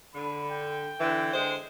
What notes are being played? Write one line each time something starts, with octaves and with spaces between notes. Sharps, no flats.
D3 B5
G5
D3 E3
D3 G#3 C5